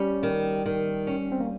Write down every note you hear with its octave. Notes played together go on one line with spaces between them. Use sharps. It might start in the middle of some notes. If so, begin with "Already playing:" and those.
Already playing: G3 C#4
D#3
D#3
C#4
C4
A#3